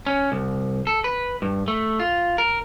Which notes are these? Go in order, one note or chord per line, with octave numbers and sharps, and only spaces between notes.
C#4
C2
A4
B4
G2
A3
F4
A#4